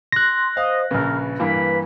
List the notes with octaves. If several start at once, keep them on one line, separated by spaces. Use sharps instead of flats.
C6 F#6 A#6
C5 D#5 F5
A#1 C#3 A#4 B4
G2 E3 A#3 B5